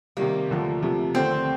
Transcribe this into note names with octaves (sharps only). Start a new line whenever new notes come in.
C3 D#3 G3 A#3
D#2 D3 F3 A3
C3 F3 A3
D#2 D3 A3 C4